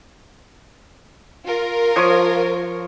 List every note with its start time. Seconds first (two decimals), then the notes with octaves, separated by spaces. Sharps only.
1.45 F4 A#4
1.96 F3 C#5 C#6